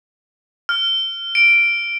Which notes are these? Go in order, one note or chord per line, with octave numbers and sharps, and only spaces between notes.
F6
D7